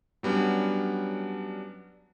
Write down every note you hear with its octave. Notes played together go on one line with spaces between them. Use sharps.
F#3 G3 B3 C#4 D4